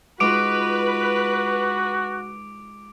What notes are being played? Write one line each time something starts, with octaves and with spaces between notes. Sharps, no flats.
G#3 D#4 F4 F#4 B4 D6 D7